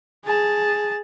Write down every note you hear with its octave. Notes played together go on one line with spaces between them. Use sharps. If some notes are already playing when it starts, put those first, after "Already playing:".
G#4 A5